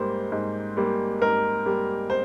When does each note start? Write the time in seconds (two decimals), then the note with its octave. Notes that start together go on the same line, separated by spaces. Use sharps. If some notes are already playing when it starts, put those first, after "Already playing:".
Already playing: G#2 G3 A#3 C5
0.32 G#2
0.77 G3 A#3
1.21 G#2 A#4
1.66 G3 A#3
2.10 C5